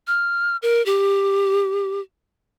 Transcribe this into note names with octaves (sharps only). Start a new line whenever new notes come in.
F6
A#4
G4